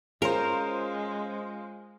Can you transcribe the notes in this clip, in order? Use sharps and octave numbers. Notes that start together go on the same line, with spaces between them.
G#3 C#4 F4 G#4 A#4 C5 C#5